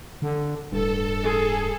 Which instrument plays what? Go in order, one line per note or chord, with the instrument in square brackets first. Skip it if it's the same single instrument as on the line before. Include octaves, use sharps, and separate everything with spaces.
[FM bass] D3
[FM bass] D1 [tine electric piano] G2 [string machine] A4
[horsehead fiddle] G#4